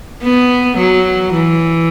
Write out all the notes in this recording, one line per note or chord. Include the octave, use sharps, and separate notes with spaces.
B3
F#3
E3